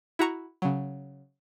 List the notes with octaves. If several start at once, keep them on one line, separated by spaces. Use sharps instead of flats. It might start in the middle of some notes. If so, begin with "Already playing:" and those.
E4 F#4 A#5 C#6
C#3 F#3